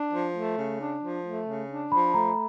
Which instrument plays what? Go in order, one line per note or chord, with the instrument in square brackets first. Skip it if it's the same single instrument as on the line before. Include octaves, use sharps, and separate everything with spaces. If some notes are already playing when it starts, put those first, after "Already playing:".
Already playing: [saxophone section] D4
F3
A3
C#3
D4
F3
A3
C#3
D4
[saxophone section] F3 [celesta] B5
[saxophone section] A3 [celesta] A#5